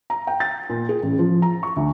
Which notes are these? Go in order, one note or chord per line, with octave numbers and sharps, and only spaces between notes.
A#5
G5
A6
A#2
G#4
A1
F3
A#5
C#6
D2